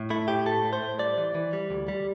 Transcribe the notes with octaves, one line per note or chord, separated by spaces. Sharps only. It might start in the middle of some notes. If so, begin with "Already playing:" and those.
Already playing: A2
A3 E4
A2 G4
A3 A4
A2
C5
A2
G3 D5
E3
E3
G3
D2
G3